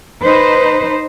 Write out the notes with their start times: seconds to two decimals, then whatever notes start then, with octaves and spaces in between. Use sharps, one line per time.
0.22 D#4 B4 C5